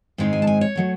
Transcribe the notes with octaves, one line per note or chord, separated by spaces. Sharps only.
G#2 D#3 G#3 C4 D#4
G#5
A5
G#5
C#5
D#3 F#3 A3